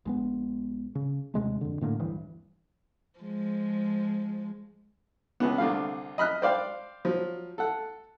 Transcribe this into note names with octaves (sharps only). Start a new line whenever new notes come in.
A#1 G#3 B3
C#3
D#2 C3 G#3 A3
F2 D3
A2 D3 A3 A#3
D1 G2 E3
F3 G#3
C#2 C#3 B3
C2 D3 A3 F5
D#5 B5 F6 F#6
C5 D5 F5 G5
F3 F#3
A4 F#5